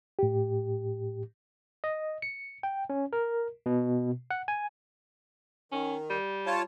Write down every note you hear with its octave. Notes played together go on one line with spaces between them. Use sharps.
A2 G4
D#5
C#7
G5
C#4
A#4
B2
F#5
G#5
D#3 C#4
G3
F4 C#5 A5